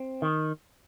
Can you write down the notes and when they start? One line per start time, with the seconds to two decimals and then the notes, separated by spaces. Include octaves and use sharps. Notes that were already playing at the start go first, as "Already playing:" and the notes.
Already playing: C4
0.22 D#3